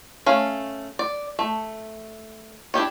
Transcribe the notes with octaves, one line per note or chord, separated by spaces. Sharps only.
A3 C#4 F5
D5
A3
D4 E4 G4 C#5